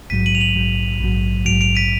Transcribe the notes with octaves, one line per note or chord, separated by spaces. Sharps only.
A#1 G#2 F#3 B6 D#7
D#7 F#7
F7
D#7 F#7
A#1 G#2 F#3
A#1 G#2 F#3
A#1 G#2 F#3 D7 F7
D7 F7
B6 D#7